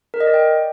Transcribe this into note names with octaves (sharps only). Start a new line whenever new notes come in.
A#4
D#5
D5
G5